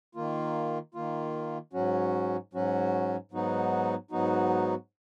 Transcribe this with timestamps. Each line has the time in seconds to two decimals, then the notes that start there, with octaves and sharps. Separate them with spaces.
0.15 D#3 A#3 F4
0.94 D#3 A#3 F4
1.73 G#2 F#3 C#4 F#4
2.53 G#2 F#3 C#4 F#4
3.32 G#2 F#3 B3 D#4 F#4
4.11 G#2 F#3 B3 D#4 F#4